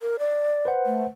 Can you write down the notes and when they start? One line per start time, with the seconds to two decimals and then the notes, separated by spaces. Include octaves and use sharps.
0.01 A#4
0.19 D5
0.65 B4 C5 F#5
0.86 A3